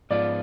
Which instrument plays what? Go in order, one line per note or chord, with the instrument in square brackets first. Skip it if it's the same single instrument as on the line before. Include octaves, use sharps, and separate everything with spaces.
[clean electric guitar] G#2 F3 B3 F4 [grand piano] D5